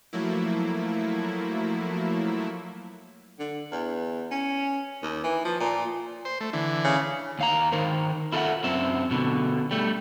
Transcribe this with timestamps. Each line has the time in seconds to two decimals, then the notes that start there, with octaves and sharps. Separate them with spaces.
0.13 F3 F#3 A3 A#3 E4
3.39 D3
3.71 E2
4.31 C#4
5.02 D#2
5.23 E3
5.45 F3
5.60 A#2
6.25 C5
6.41 A3
6.53 D3 E3
6.84 C#3
7.39 D#2 F5 A#5
7.72 D#3 A#4 C5
8.32 E4 F4 A4 D5 E5 F#5
8.64 F#2 C4 E5
9.11 B2 D3
9.71 G3 A3